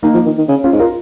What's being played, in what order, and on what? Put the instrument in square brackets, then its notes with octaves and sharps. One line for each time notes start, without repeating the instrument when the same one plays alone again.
[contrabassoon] D#3 [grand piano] A#3 D#4
[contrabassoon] F3
D#3
D#3
C#3
[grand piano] C#4 F4
[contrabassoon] G#2
[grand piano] F4 A#4